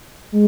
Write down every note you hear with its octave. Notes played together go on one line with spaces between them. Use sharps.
G#3